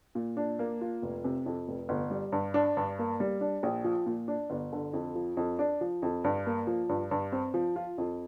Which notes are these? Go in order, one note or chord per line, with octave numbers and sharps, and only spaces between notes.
A#2
D4
A#3
F4
F1
C3
F2
F1
G1
G3
G2
D4
G2
A#3
G3
D4
A#1
F3
A#2
D4
G1
D3
F2
F3
F2
D4
F3
F2
G2
A#3
F3
G2
G2
C4
F3
F4
F2